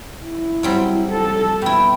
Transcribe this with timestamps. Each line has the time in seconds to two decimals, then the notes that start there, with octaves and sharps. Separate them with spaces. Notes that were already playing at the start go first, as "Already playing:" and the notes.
0.24 E4
0.63 F#3 G3 C4
1.12 A4 A5
1.62 B2 E4 G5